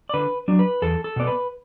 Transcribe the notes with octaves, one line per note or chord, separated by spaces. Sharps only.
D5
D3 B4
F#3 D4
B4
E2 A4
A4
B2 B3 D5
B4